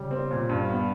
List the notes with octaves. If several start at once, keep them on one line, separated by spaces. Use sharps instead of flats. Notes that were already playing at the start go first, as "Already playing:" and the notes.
Already playing: C#3 G3
C4
A#2
G2 G3
B3